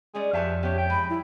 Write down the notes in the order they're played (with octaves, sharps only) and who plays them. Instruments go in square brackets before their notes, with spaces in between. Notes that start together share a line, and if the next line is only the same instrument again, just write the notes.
[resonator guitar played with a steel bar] G3 C#4 D5 [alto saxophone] G#3
[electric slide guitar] F2 E5 A5 [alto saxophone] G4 [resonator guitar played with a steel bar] B4 C#5 F5
[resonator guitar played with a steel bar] B3 C#4 [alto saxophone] G4 [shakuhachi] C#5
[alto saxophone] G5
[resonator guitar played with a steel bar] G#3 [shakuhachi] B5
[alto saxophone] G3 [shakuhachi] E4